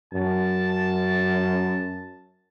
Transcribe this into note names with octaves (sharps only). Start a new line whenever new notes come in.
F#2 A5